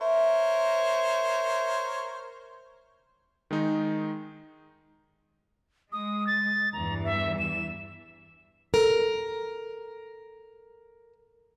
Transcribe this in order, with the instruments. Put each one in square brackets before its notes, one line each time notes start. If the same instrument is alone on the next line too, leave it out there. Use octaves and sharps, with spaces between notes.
[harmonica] A#4 C5 C#5 [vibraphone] E5
[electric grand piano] D#3 G#3 D#4
[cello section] G#3 [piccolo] D#6
[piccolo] A6
[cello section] E2 G2 E3 [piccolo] A#5
[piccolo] E5
E7
[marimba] A4 [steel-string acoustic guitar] A#4